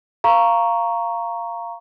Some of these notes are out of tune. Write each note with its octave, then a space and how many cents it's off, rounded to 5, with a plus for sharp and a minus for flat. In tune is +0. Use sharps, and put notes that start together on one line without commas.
F5 -10 A#5 +0 C#6 +0